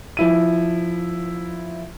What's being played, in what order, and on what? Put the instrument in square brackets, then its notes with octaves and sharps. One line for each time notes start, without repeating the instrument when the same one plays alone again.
[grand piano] F3 E4 D#7